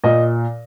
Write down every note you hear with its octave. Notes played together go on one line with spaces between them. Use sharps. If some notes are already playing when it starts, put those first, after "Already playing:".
A#2 D#5